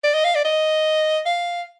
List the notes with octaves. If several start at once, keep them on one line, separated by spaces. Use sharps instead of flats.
D5
D#5
F5
D5
D#5
F5